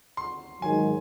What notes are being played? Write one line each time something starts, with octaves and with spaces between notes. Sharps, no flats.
C6
G#2 D#3 F#3 G#5